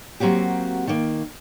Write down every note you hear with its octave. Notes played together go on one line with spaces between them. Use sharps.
F#3 A#3 C4 F#4 G4
D#3 A#3